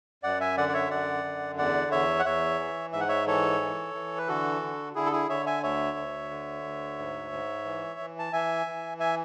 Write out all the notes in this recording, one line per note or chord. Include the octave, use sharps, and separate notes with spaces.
F#2 D5 F#5
E5 G#5
D3 D5 F#5
D5
C#5 E5
F#2 D5 F#5
D3
E2 D5 F#5
E2 C#5 E5
F#5
E2 C#5 E5
E3
G#2 E5
F#5
C#5 E5
E3 A4 C#5
E3
E3
B4
D3 F#4 A4
D3
D3 E4 G#4
A4
E4 G#4
D3 C#5 E5
E5 G#5
D2 C#5 E5
D2
D3
D2
G#2
G#2
E3
E3
A5
E3 E5 G#5
E3
E5 G#5